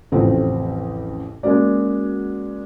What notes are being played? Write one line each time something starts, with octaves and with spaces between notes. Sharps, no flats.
A1 F2 C#3 C4 A4
G#3 A#3 C#4 F#4 D5